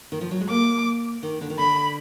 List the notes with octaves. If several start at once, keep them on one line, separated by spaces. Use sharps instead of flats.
D#3
F3
F#3
G#3
A#3 D6
D#3
D3
D#3
D3 B5